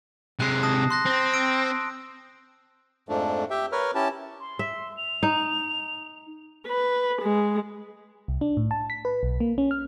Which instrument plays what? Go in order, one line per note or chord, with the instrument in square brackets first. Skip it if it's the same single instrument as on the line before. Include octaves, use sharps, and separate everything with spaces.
[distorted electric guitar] C3 G#3 [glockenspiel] F#6 C7
[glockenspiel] A5 D#6 A#6
C6 F#6 A#6
[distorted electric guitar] C4
[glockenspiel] E6 D7
[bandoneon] F2 G#2 F3 A3 D4
G4 E5 G5
A#4 B4 C#5 F6
C#4 E4 G4 A5
[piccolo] C6
[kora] E5
[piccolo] F7
[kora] D#4
[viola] B4
G#3
[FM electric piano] C2
D4
A2
A5
B6
B4
B1
A#3
C#4
F6